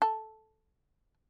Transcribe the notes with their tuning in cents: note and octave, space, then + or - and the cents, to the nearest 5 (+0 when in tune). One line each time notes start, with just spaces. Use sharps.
A4 -5